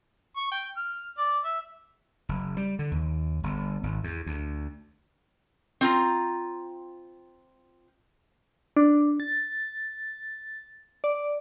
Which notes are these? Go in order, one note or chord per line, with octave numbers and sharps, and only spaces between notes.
C#6
G5
F6
D5
E5
F#1
G3
D3
D#2
G1
G#1
E2
D2
C4 F4 A#5
D4
A6
D5